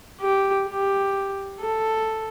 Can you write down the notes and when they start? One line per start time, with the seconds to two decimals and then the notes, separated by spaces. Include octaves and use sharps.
0.21 G4
0.67 G4
1.60 A4